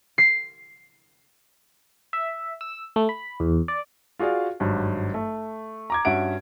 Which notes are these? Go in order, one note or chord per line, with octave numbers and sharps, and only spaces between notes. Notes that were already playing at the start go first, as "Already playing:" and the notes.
C7
E5
E6
A3
B5
E2
D5
F4 F#4 G#4 D5 F5
G#1 G2 F#3
A3
A#5 D6 G#6
G2 C#4 F#4 E5 F#5 D7